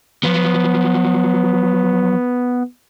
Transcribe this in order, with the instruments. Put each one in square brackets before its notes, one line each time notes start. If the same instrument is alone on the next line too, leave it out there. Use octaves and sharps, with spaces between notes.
[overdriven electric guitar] F3 F#3 [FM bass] B3